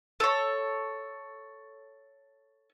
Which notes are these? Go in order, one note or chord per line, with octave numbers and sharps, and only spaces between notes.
A4 C#5